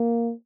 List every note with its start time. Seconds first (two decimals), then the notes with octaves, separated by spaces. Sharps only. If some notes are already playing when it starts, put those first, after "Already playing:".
Already playing: A#3